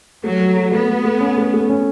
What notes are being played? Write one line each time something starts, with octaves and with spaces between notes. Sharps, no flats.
F#3 A3
A4
A3
A3 B3
A3
A3
C#4
A3
A3
C#4